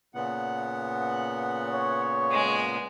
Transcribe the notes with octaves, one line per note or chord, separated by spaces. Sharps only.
A#2 C#3 B3 F#5
C#5
G#3